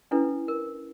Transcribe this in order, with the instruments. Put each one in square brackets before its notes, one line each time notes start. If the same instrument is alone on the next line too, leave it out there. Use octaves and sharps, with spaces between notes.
[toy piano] C#4 D4 E4 A4 B4
A#4